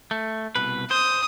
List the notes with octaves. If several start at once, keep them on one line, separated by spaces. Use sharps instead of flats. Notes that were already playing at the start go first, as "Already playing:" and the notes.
A3
C2 B2 B4
C5 D#6